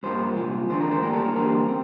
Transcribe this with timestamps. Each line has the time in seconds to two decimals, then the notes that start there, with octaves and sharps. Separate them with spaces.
0.03 G2 F3 A#3 C5
0.36 C2 A#2 F3
0.70 E2 D3 A3 C5
0.81 A#4
0.91 C5
1.02 A2 G3 A#3 A#4
1.13 A4
1.24 A#4
1.36 E2 D3 G3 A#3 C5
1.68 C4